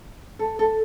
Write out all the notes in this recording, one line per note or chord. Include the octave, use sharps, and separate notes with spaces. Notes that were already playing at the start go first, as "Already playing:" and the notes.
A4
A4